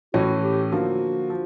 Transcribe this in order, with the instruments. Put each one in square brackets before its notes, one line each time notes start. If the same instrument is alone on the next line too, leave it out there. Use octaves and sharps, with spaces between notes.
[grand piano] A2 E3 A3 C#4 [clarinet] F#4
[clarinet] G4
[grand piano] D3 F3 A#3 [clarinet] F#4
[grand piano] F3